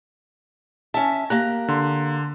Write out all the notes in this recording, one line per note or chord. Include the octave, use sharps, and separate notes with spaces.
C#4 E5 A5
A#3 G4 A#5 F#6
D3 C6